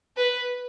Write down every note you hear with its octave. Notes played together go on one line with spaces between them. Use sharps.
B4